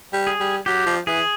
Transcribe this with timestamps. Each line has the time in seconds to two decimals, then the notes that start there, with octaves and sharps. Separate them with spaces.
0.13 G3
0.27 G#4
0.40 G3
0.66 F#3 G4
0.86 F3
1.07 E3 G#4